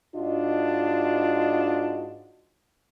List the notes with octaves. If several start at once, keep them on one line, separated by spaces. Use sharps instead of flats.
G#2 D4 F4 F#4 D#5